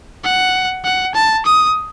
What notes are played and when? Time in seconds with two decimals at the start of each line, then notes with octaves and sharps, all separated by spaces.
0.24 F#5
0.84 F#5
1.15 A5
1.46 D#6